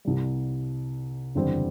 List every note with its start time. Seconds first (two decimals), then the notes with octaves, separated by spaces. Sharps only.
0.05 C2 C3 G3
1.35 F#1 E2 D3 G3 C4